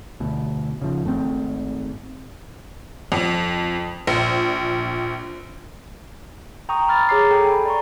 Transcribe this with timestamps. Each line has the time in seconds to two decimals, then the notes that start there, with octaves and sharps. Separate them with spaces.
0.20 D2 B2
0.81 C#3 F3
1.04 G#1 A3 C4
3.12 F2
4.07 A#1
6.69 G5 A#5 C#6 D#6
6.88 B5 F6 A6
7.09 G#4 C#5 A#5 D6 C7
7.31 A4 G5
7.44 G#5 B5
7.65 D5 A#5 C6 C#6